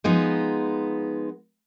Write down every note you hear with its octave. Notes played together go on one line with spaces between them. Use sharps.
F3 G#3 B3 D#4